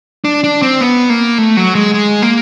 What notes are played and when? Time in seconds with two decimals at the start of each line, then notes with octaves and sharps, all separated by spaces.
0.25 D4
0.44 D4
0.62 C4
0.81 B3
1.10 A#3
1.38 A3
1.57 F#3
1.75 G#3
1.94 G#3
2.22 A#3